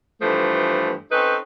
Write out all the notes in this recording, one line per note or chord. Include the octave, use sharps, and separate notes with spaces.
G2 E3 F3 A3
C4 C#4 D#4 A4 B4